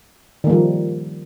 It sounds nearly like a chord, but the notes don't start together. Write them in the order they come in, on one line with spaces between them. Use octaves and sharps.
D#3 A#3 F3 G3